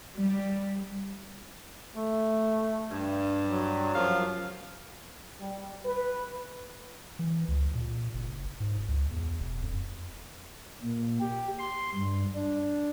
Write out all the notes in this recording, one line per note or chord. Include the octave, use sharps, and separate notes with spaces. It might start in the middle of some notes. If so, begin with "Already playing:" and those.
G3
A3
G2
F#3
F#2 F3 F5
G3
B4
E3
C#2
A#2
F#1
G#2
C#2
E2
E1
F2
A#2
G4
C6
G2
D4